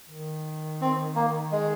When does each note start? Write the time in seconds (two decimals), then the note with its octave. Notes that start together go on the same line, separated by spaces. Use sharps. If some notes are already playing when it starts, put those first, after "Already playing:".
0.10 D#3
0.81 C4
1.16 A#3
1.52 G#3